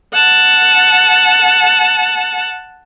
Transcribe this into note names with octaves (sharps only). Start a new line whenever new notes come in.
F#5 A5